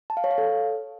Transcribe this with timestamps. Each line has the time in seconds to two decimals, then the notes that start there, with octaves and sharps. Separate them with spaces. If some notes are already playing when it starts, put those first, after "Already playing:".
0.10 A5
0.17 F5
0.24 C#5
0.31 F5
0.38 A4